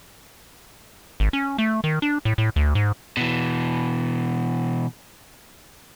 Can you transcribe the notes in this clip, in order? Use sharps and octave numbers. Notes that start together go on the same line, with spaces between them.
G#1
C#4
A3
D#3
D4
A2
A2
D2
G#2
B2 E3